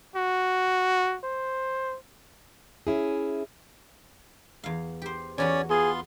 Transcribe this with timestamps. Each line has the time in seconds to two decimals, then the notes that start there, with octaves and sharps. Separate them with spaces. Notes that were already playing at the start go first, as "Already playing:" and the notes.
0.16 F#4
1.24 C5
2.87 C#4 E4 G#4
4.64 E2 F5
5.02 G4 C5
5.38 E2 C#4 F#4 B4 C#5 D5
5.70 B3 F4 G#4 C6